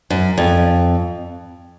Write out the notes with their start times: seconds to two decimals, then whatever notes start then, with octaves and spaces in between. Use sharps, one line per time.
0.10 F#2
0.38 F2